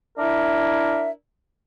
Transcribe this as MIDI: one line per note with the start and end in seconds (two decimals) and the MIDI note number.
0.18 1.10 62
0.18 1.10 64
0.18 1.10 70
0.18 1.10 76